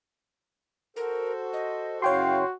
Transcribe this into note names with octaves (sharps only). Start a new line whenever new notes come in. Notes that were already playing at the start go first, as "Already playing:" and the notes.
F#4 A4 A#4 C5
D#5
F#2 C#3 E4 F#4 C#5 F5 G5 C6